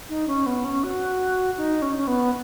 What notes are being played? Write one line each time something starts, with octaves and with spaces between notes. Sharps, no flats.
D#4
C#4
B3
C#4
F#4
D#4
C#4
C#4
B3